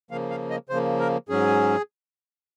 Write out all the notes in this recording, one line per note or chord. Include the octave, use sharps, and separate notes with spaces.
C#3 F3 A#3 F5
F5
D#5
C#3 F3 A#3 C5
A#4
G#2 F#3 C#4 G#4